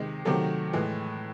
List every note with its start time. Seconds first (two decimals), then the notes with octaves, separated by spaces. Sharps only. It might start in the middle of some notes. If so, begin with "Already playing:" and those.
Already playing: C3 D#3 G#3
0.25 C3 D#3 F#3 A3
0.73 A2 E3 G#3